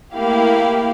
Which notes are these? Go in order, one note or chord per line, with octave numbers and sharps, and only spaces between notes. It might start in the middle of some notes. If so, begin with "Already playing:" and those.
A3 A#3 E4 G4 F5